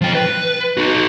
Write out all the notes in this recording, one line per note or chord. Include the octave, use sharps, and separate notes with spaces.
F3 G5
B4
D#4 F#4